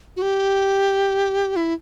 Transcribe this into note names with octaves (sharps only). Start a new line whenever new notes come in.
F#4
G4
E4